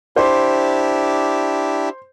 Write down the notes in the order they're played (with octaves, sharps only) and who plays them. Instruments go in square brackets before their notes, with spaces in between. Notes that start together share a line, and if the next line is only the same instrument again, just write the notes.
[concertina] D4 E4 G4 [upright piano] C5